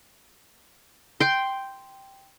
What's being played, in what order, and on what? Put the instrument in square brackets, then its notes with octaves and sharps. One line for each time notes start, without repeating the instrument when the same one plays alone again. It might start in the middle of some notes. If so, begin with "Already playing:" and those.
[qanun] G5 C6